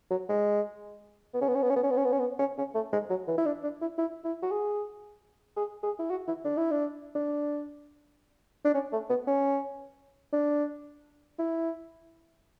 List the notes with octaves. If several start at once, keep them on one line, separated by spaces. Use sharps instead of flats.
F#3
G#3
B3
C#4
B3
C#4
B3
C#4
B3
C#4
B3
C#4
B3
C#4
B3
C#4
C#4
A3
G#3
F#3
E3
E4
D4
D4
E4
E4
E4
F#4
G#4
G#4
G#4
E4
F#4
E4
D4
E4
D4
D4
D4
C#4
A3
B3
C#4
D4
E4